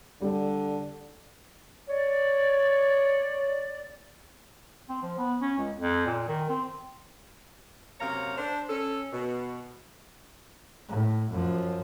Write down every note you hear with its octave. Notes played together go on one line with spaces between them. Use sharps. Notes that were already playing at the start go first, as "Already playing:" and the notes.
D3 G3
C#5 D5
C4
F3
B3
C#4
C#2
F2
A#2
D#3
C4
F#2 C3 A#3 C#5 F5 A#5
D4 C5
C#4 A4
B2
A2
F#2 F3